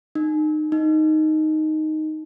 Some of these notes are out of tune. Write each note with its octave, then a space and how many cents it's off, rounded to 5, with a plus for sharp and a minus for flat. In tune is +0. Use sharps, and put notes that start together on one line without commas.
D#4 -25
D#4 +0